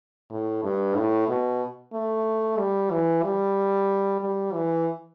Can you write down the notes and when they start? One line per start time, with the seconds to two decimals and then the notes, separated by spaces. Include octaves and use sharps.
0.31 A2
0.64 G2
0.96 A2
1.28 B2
1.93 A3
2.59 G3
2.91 E3
3.24 G3
4.21 G3
4.54 E3